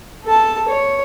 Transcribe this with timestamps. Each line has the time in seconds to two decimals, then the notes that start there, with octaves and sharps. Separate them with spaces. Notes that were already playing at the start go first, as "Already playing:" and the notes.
0.25 A4 A5
0.68 C#5